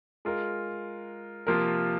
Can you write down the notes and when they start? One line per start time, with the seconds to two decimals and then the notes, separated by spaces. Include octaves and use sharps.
0.25 G#3 F4 A#4
1.47 C3 F3 A#3 F4 A#4